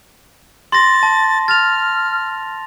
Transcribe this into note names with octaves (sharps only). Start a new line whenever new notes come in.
C6 A6 A#6
A5
F6 A6 F7